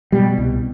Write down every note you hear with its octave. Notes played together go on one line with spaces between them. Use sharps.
B2 G3
C2